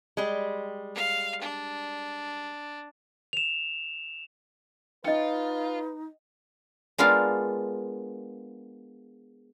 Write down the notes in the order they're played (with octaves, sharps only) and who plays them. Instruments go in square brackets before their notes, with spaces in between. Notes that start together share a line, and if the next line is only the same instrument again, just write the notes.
[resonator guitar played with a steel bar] G3 G#3
[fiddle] F5
D4
[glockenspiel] E7 F7
[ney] D#4 [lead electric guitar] F4 [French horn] B4 [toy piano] D#5 G5
[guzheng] G#3 B3 D4 F4 A#4 F5